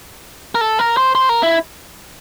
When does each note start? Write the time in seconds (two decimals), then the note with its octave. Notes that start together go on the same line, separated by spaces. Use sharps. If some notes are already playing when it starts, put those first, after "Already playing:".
0.55 A#4
0.61 A4
0.79 A#4
0.97 C5
1.15 C5
1.29 A#4
1.43 E4